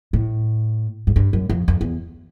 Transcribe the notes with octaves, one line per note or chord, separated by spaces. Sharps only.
A2
G#2
G2
F#2
F2
F2
E2